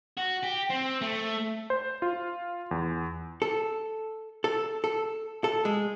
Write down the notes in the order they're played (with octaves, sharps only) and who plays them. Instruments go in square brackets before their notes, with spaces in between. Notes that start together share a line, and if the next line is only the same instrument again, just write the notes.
[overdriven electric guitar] F#4
G4
C4
A3
[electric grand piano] C5
F4
E2
[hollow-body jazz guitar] A4
A4
A4
A4
G#3